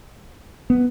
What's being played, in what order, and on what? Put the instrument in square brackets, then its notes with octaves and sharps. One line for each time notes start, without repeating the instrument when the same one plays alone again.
[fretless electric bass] B3